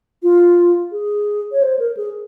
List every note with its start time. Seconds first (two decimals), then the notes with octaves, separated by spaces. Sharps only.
0.23 F4
0.92 G#4
1.52 C#5
1.62 C5
1.79 A#4
1.97 G#4